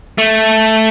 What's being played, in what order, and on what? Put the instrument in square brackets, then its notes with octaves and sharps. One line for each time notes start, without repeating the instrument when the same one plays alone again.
[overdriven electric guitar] A3